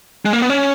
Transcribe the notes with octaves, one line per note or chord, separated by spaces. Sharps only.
G#3
A#3
B3
C#4